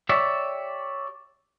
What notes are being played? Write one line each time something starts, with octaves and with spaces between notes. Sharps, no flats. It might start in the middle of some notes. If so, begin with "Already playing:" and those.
G4 C#5 D5 E5